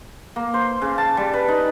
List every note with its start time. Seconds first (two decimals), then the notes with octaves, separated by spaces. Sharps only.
0.36 A#3
0.54 C5
0.81 C#3
0.98 A5
1.17 G3
1.33 B4
1.48 D#4